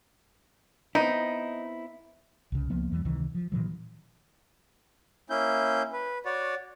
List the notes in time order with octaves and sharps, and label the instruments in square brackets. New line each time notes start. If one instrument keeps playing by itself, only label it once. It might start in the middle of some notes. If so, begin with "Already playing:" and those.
[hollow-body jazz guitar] B3 C4 E4 [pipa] D#4
[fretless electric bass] C2 C#3
C#2 F3 A#3 B3
E2 E3 F#3 G3
C#2 C3 D#3 E3
F3
A#2 D#3 E3 F#3
[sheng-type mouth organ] A#3 C#4 E4 G6
B4
F#4 C#5 D5